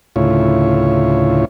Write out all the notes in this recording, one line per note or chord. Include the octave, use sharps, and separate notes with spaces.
D2 A2 C#3 E4 F4 C#5